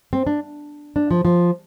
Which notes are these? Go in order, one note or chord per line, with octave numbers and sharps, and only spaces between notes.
C4
D4
D4
F3
F3